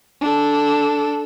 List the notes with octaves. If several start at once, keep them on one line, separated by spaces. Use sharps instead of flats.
D4 A4